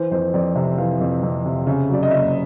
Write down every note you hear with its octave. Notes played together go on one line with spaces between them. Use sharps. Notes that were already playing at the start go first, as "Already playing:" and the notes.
Already playing: E3 C5
F2 C5
F2 D5
C3 E5
E3 F5
F2
F2
C3
C#3 E5
F#3 D5
D#5
F#1 E5